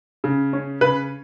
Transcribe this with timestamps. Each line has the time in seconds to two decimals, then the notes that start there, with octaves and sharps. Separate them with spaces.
0.24 C#3
0.53 C#4
0.81 C#3 B4